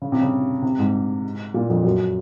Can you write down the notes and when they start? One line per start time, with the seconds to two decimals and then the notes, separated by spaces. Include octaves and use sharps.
0.02 C#3
0.12 C3
0.21 C#3
0.62 C3
0.79 G#2
1.54 A#2
1.69 F2
1.84 F#2